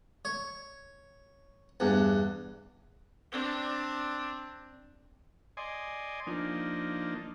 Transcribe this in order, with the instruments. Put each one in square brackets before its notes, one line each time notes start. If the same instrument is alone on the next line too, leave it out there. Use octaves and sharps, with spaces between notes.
[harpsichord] C#5
E2 G2
[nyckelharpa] C4 D4
[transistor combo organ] D5 D#5 G#5 C6
F3 A#3 D4 D#4